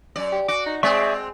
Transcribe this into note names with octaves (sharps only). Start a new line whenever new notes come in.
F#2 D5
G4
F#4 D6
D#4
G#3 C4 G#4 D5 E5 C#6